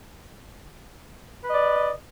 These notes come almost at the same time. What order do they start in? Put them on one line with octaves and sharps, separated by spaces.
B4 D#5 D5